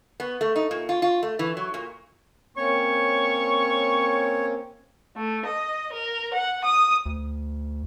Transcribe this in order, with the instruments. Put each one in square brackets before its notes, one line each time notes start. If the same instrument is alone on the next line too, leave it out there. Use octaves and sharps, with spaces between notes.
[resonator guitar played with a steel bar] B3
A3
D#4
A#2
F4
F4
A3
E3
F#3
A#2
[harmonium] A#3 C4 C#4 [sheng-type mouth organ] C#5 [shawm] C#6
[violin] A3
D#5
A#4
F#5
D#6
[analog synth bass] D2